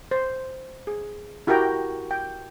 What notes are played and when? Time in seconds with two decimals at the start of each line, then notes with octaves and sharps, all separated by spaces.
0.11 C5
0.87 G#4
1.47 E4 F#4 G4 A#4 G5 A#5
2.11 G5